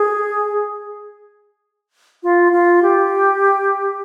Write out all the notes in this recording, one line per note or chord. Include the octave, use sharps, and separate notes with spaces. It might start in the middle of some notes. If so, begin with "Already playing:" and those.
Already playing: G#4
F4
F4
G4